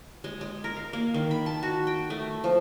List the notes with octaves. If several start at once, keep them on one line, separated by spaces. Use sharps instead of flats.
G#3
G#3
A#4
F5
A#3
D#3
B5
A5
F#4
G5
A3
F3